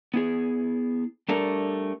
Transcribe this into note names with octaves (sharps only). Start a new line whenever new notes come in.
B3 E4 G#4
G3 A3 D4 A4 A#4